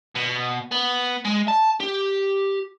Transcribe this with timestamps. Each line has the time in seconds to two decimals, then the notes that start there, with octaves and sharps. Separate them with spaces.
0.16 B2
0.72 B3
1.25 G#3
1.48 A5
1.80 G4